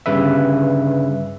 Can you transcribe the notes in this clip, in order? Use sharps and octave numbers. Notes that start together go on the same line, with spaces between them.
G1 G2 C#3 B4 E5